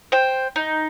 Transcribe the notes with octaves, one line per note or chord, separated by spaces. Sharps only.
C5 G5
D#4